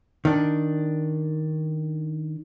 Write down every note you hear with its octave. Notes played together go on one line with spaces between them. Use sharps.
D#3 D4